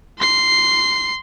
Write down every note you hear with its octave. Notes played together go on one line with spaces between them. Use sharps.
C6 C7